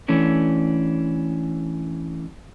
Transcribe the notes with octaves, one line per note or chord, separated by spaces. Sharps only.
E3 A3 C#4 D4